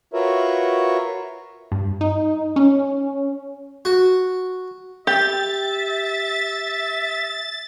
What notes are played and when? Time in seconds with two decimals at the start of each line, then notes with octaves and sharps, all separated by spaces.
0.14 F4 F#4 A#4 B4 C#5 E5
1.72 G2
2.01 D#4
2.56 C#4
3.85 F#4
5.07 G4 E5 A6